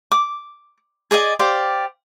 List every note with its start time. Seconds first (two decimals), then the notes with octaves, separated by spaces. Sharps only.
0.12 D6
1.11 G#4 D5 D#5 G#5
1.39 G4 C5 D5 F5